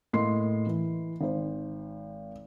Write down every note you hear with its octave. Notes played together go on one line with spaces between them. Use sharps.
A2 A#3 D#5 C6 C7
E3
G#1 C5